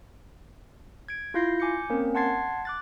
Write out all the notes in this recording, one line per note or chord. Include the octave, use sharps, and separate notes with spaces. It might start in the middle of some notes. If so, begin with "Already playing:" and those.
G#6 D7
E4 F4 F5 G6 A#6 C7
G#5 D6 G6 C#7
A#3 C4 C#4 A#4
F#5 A5 C6 G#6 A6 C7
D6 F#6 A6